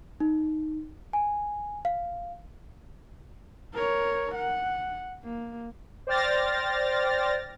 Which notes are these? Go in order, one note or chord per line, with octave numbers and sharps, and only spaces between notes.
D#4
G#5
F5
A#4 C#5
F#5
A#3
C5 D5 G5 F6 A6 A#6